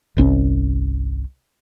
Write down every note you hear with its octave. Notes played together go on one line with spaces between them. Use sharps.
G1 C2 C4 C#4